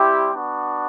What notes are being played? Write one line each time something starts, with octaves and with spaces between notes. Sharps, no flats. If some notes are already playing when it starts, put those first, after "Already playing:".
Already playing: G3 C4 E4 G4
B3 D4 F#4